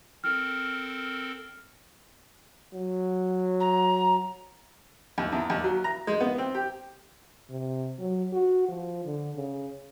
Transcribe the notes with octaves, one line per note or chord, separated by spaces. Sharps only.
C4 A4 A#4 F6
F#3
A#5
D#2
E2
D#2
F#3
A#5
G#3
B3
C4
G4
C3
F#3
F#4
F3
D3
C#3